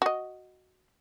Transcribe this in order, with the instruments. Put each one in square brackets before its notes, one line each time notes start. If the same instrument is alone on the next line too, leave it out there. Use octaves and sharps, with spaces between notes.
[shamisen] F#4 D#5